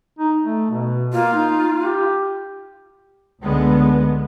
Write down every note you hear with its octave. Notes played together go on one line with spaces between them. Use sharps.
D#4
A3
B2
A#3 F4
D#4
G4
C#2 D3 G#3 B3